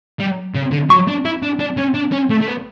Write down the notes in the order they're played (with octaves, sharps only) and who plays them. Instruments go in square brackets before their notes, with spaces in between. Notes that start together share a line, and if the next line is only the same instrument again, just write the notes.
[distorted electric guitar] G3
C#3
D3
[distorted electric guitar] F#3 [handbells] C#6
[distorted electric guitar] D4
E4
D4
D4
C#4
D4
C#4
A3
A3
B3